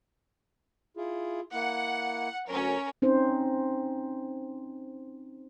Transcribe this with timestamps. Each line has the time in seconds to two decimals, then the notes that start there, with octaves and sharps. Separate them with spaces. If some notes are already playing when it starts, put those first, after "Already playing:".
0.97 E4 F4 G#4
1.53 A#3 E4 F#5
2.48 D2 F#3 C#4 A#4 C#5
3.02 C4 C#4 D#4 C5